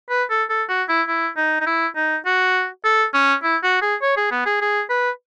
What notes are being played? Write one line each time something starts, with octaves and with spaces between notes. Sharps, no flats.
B4
A4
A4
F#4
E4
E4
D#4
D#4
E4
D#4
F#4
A4
C#4
E4
F#4
G#4
C#5
G#4
B3
G#4
G#4
B4